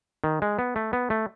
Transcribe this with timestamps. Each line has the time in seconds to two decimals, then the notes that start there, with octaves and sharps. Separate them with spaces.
0.24 D#3
0.42 G#3
0.59 B3
0.76 A3
0.93 B3
1.10 A3